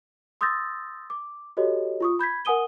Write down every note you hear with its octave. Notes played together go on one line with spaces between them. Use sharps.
C6 D#6 E6 G6 A6 A#6
D6
F#4 G4 A4 C#5 D#5
F4 C#6 D#6
B5 G6 G#6 B6
A#4 F#5 G#5 D#6 D#7 G7